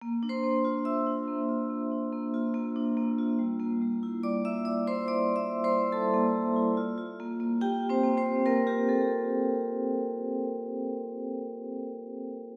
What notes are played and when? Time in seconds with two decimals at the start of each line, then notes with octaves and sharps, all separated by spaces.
0.01 A#3
0.23 D4
0.29 C5 C6
0.44 A#3
0.65 F4
0.85 A#3 E5 E6
1.07 D4
1.28 A#3
1.49 F4
1.70 A#3
1.92 D4
2.13 A#3
2.34 F4
2.54 A#3
2.76 D4
2.97 A#3
3.18 F4
3.39 G3
3.60 A#3
3.81 G3
4.03 E4
4.23 G3 D5 D6
4.45 A#3 E5 E6
4.65 G3 D5 D6
4.86 E4 C5 C6
5.08 G3 D5 D6
5.29 A#3
5.36 E5 E6
5.50 G3
5.64 C5 C6
5.72 E4
5.92 G3 A4 A5
6.14 A#3
6.35 G3
6.56 E4
6.77 F4
6.98 F4
7.20 A#3
7.40 A#3
7.61 F4 G4 G5
7.83 F4
7.89 C4 C5
8.03 A#3
8.17 C4 C5
8.25 A#3
8.45 A#3 F4 A#4
8.67 F4 G4
8.88 A#3 A4